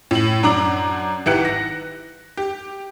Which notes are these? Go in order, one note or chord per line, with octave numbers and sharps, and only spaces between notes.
A2 F#7
F#2 D4 A#5 D6 F#7
G#1 E4 G4 B4 F#6 C#7
A#6
G4